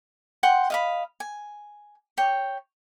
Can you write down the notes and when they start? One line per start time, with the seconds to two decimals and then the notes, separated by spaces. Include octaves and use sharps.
0.43 F#5 G5 C6
0.70 D#5 F5 B5
1.20 G#5
2.18 C#5 G5